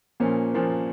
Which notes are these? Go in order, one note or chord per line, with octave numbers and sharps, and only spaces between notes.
A#2 F3 A#3 C#4
A#2 F3 A#3 C#4